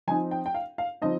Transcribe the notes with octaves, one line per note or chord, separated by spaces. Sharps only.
F3 C4 D#4 G#5
G5
G5
F5
F5
F3 C4 D#4 D#5